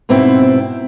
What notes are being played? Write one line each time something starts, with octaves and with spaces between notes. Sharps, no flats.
G#2 B2 B3 C4 E4